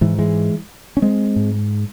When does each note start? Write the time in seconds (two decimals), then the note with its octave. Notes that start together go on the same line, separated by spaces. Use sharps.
0.01 G#2 E3
0.18 E3 G#3
0.97 C#4
1.02 G#3 C4
1.36 G#2